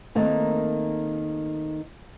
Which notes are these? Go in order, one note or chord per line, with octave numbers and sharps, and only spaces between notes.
D#3 A3 A#3 C4